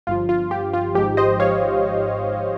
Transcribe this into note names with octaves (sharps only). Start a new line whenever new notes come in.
G1 G2 F3 F4
F4
G4
F4
G#1 G#2 F3 G4
C5 D#5
C#5 F5